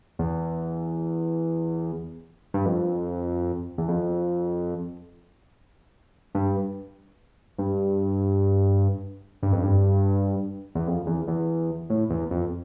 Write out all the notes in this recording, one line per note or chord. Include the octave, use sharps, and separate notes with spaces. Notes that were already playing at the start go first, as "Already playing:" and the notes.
E2
G2
F2
E2
F2
G2
G2
G2
F2
G2
E2
F2
E2
E2
A2
E2
F2